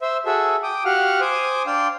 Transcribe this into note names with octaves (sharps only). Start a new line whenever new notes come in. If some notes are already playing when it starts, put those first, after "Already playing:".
C5 E5
F#4 G#4 A4 E5
G5 D6 D#6
F#4 G4 F5 F#5 F6
C5 G#5 D6 D#6
D4 F5 G5 C6